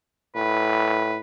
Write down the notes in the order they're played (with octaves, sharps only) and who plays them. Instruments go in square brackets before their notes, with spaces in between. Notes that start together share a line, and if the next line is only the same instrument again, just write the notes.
[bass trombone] A2 [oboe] B4